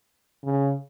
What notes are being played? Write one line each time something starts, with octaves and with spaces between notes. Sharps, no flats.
C#3